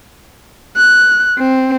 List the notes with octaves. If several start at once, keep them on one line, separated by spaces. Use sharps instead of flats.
F#6
C4